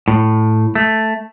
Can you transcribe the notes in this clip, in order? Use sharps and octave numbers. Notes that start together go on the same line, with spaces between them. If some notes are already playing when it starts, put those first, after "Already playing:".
A2
A3